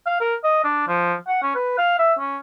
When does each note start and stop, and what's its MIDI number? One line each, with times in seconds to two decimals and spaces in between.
0.06 0.18 77
0.20 0.35 70
0.44 0.64 75
0.64 0.87 62
0.88 1.15 53
1.27 1.42 78
1.43 1.54 61
1.55 1.75 71
1.78 1.97 77
1.99 2.14 76
2.19 2.39 61